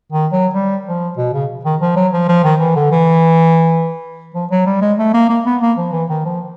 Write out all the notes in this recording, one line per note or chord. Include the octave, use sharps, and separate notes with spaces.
D#3
F#3
G3
F3
B2
C#3
D#3
F3
F#3
F3
F3
D#3
E3
D3
E3
F3
F#3
G3
G#3
A3
A#3
A#3
B3
A#3
F3
E3
D#3
F3